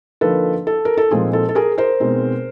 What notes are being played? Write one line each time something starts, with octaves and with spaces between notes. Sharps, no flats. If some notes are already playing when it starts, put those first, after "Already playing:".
D3 F3 A#3 D#4 A4 B4
A4
A#4
A4
A#2 F3 G#3 C4 D#4 G#4
A4
A4
G#4 A#4
A#4 C5
B2 G#3 C4 D#4